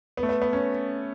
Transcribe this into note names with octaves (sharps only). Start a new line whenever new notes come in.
B3
A3
B3
B3
C#4